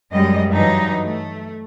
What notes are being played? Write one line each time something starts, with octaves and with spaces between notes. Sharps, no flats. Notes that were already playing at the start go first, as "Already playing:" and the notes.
F#2 G3 G#3 D#5
G2 E3 F#3 D#4
A3